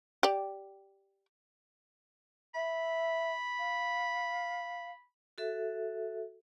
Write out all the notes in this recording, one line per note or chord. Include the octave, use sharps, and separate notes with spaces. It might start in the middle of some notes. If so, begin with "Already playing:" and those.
G4 D5
E5 B5
F5
F#4 A4 E5